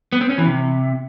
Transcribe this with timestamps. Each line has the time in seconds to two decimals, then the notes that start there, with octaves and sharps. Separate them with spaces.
0.13 B3
0.21 C4
0.30 C#4
0.38 E3
0.47 C3